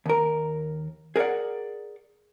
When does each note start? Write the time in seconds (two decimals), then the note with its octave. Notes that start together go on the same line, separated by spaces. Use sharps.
0.06 D#2 A#4
1.16 G#4 A#4 C#5 D5 F#5